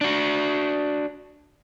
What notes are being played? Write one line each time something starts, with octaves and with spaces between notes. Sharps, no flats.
D4 F#4